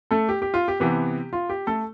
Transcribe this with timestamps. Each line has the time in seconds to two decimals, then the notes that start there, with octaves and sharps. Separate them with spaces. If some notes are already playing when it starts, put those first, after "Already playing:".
0.11 A3 A4
0.29 G4
0.42 G4
0.54 F4
0.68 G4
0.80 C3 E3 B3 G4
1.33 F4
1.50 G4
1.67 A3 A4